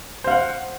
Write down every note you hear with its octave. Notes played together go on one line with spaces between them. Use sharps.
C5 F5 F#5